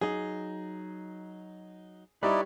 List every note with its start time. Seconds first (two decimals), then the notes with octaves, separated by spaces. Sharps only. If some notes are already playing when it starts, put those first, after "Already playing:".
0.01 F#3 D#4 G#4
2.23 G3 D#4 E4 B4 C#5 D5